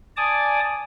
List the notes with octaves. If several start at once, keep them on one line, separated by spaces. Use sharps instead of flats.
D5 G#5 A5 D6 D#6